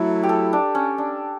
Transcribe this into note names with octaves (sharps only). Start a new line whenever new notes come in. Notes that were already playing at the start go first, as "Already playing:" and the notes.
Already playing: F#3 A3 E4 A4
G4
A4
D4
C#4
D4